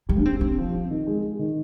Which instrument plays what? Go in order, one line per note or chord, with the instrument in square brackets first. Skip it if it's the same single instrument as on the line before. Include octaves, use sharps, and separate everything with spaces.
[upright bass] G3 [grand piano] G4
[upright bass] D4
[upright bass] C4 [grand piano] G4
[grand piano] C4 [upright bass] D4
[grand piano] F3
C4
D#3
G#3
G#3
D#3